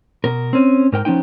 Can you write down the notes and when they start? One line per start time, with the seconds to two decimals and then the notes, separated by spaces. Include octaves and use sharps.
0.24 B2 A#4
0.53 C4 C#4
0.92 G#2 A#4 G5
1.05 F3 B3 C#4 D#4 G5